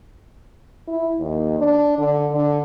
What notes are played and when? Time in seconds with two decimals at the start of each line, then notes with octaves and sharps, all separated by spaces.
0.88 E4
1.19 D#2
1.58 D4
1.98 D3
2.31 D3